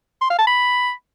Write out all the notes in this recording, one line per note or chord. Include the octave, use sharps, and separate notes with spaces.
C6
F5
A5
B5